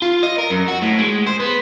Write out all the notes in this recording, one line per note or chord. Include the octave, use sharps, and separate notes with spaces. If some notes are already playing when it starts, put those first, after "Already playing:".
F4
D#5
A#4
F#2
F#4
A2
G#3
C5
B3